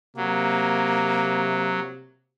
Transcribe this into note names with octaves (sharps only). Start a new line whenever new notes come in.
C3 F#3 A#3